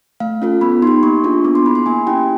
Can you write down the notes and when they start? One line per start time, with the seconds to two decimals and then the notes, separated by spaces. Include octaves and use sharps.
0.20 A3 F5
0.42 C#4 F4 A4
0.61 B3 B5
0.82 D#4 G4 C6
1.03 A#3 C#6
1.24 D4 F4 G#4
1.45 B3 D6
1.55 C6
1.65 E4 G#4 B5
1.75 C6
1.86 A#3 G#5
2.07 C#4 E4 G4 G5